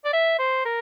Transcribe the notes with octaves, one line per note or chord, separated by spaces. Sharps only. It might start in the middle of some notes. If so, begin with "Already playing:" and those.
D5
E5
C5
A#4